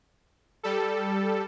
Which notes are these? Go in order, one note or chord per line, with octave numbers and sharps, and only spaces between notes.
G3 A4